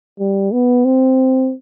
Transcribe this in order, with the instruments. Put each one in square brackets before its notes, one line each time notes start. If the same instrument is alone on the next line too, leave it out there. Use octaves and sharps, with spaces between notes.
[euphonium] G3
B3
C4